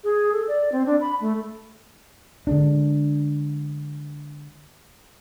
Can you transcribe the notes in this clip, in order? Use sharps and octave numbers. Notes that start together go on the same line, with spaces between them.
G#4
A4
D5
C4
D4
B5
A3
D3 G#3 D4